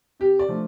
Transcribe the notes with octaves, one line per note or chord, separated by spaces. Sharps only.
C3 G4
D5
F3 A3 D4